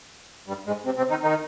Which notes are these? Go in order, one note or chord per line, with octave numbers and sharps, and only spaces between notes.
G2 G3
G#2 G#3
C3 C4
C3 C4
D#3 D#4
D#3 D#4